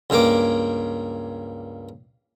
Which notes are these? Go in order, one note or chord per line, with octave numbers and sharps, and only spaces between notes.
C#2 G2 A#3 A#4 D6